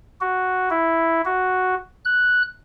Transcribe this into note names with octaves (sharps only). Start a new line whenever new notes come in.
F#4
E4
F#4
F#6